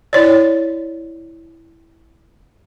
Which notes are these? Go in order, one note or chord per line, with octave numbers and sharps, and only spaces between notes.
E4 C#5 D5